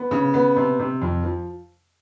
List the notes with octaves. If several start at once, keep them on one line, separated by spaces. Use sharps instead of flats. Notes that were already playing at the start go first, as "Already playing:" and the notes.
Already playing: B3
C#3
B3
C3
C3
F2
F3